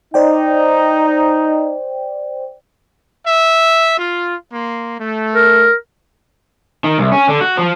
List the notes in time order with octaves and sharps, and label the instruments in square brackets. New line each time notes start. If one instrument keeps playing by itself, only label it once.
[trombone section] D#4 [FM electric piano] C5 D5 G5
[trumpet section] E5
F4
A#3 C6
A3
[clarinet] A#4
[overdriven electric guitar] D#3
C2
C#4
D3
F#4
F3